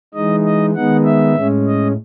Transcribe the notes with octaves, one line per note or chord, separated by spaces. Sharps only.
E3 G#3 D#4 D#5
D#5
D#3 G#3 B3 D#4 F#5
E5
A2 G#3 C#4
D#5